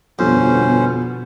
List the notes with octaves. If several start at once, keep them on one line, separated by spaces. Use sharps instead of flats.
G1 F2 B2 B3 C#4 C5